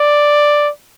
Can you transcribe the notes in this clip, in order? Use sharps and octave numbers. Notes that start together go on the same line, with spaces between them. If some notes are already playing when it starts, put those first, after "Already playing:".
Already playing: D5